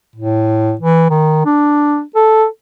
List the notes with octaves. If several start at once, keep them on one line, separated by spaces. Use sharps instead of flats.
A2
E3
D#3
D4
A4